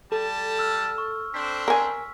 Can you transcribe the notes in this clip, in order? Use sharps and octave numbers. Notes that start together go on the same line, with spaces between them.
G3 A4 A5
E6 F6
C#6
C4 D4 C5 B6
A#4 G#5